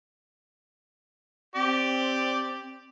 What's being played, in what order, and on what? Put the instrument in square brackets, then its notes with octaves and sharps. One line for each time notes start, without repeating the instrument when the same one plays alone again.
[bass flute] C4 [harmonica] G4 D5